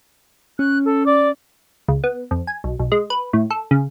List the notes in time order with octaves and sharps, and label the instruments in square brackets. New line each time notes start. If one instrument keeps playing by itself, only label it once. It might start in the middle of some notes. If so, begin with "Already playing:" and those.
[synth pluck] C#4 [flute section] F#6
[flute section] A4
D5 D6
[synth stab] C#2
B3
F2
G#5
B1
B1
G#3
B4
A2
A4
C#3